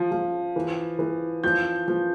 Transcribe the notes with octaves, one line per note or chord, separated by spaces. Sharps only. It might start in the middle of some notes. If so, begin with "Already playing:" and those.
Already playing: F3
F3
E3
E3
F3 G6
F3